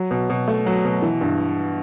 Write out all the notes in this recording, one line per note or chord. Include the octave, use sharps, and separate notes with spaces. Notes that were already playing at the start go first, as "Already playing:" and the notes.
Already playing: F#3
B2
B2
A3
F#3
B2
E3
G2